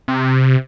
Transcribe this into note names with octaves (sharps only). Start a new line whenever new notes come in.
C3